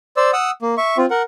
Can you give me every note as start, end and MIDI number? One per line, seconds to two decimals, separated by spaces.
0.17 0.31 72
0.17 0.31 74
0.17 0.31 88
0.33 0.51 78
0.33 0.51 87
0.33 0.51 88
0.62 0.75 58
0.77 0.97 76
0.77 0.97 85
0.97 1.06 60
0.97 1.06 65
1.10 1.22 70
1.10 1.22 78